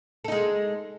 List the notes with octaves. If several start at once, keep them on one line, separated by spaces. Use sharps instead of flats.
G#3 D#4 A4